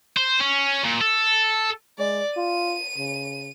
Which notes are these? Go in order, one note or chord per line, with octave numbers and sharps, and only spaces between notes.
C5
C#4
A#2
A4
G#3 D5
F4 D#7
C#3